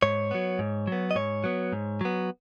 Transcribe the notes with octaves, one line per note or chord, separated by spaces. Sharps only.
G#2 C#5
F#3 B3
G#2
F#3 B3
D#5
G#2 C#5
F#3 B3
G#2
F#3 B3